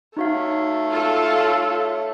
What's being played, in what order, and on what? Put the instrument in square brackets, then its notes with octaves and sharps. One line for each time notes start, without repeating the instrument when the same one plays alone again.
[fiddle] A3 C#5 [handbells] D#4 F#4 F5
[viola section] F4 A4